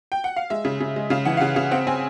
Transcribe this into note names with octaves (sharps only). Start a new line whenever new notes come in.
G5
F#5
F5
G#3 E5
C#3
C#3
G#3
C#3 F5
E3 F#5
F5
C#3 F#5
C#3 F5
C4 F#5
C4 G#5